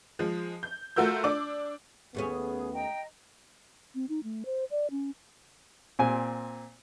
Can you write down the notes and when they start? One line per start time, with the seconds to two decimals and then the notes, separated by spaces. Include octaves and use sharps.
0.19 F3 G#3
0.63 G6
0.96 A3 F4 F#4 A#4 E6 G6
1.24 D4 D6
2.15 D#2 A3 B3 C#4 G#4
2.74 D#5 G5 A#5
3.95 C4
4.09 D#4
4.24 A3
4.46 C5
4.71 D5
4.91 C#4
5.99 A#2 C4 G#5